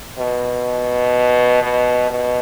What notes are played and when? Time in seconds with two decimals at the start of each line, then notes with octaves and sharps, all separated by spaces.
0.18 B2
1.62 B2
2.10 B2